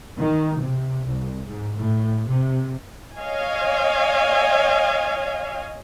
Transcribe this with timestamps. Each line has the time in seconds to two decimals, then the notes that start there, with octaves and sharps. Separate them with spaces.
0.18 D#3
0.59 C3
1.06 C2
1.45 G#2
1.76 A2
2.27 C3
3.17 C#5 D#5 F5 G#5